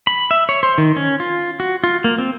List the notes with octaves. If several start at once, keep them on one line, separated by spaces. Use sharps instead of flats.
B5
E5
C#5
C5
D#3
C#4
F4
F#4
F4
A#3
C4